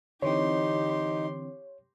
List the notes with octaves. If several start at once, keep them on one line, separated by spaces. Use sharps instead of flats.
D3 E3 C4 D#4 G4 C#5 C6